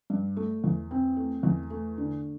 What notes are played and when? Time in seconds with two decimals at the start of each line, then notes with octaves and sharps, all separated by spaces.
0.10 G2
0.37 A3
0.64 E2
0.91 C4
1.17 A3
1.43 E2
1.70 A3
1.98 D3